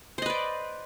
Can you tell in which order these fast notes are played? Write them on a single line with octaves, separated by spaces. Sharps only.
C5 D#5 B4 D5